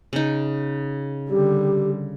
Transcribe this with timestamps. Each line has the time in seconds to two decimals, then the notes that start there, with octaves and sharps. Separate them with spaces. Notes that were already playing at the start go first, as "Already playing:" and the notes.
0.13 C#3 D#4
1.30 D3 G3 G4